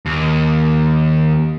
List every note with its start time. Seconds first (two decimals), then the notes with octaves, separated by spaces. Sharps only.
0.06 D#2